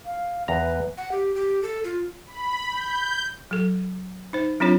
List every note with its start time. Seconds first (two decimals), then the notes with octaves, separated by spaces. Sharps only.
0.06 F5
0.48 E2 B4 A#5
0.97 F#5
1.12 G4
1.35 G4
1.63 A4
1.84 F4
2.27 B5
2.70 G6
3.51 F#3 A4
4.33 D#4 C5
4.60 F#3 C4 D4 F4 C#5